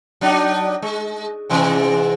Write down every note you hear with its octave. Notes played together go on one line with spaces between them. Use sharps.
F#3 D4 D#4
G#3
G#2 C3 E3